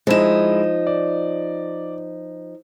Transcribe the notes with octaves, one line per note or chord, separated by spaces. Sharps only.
F3 G#3 D#4 E4 E7
D5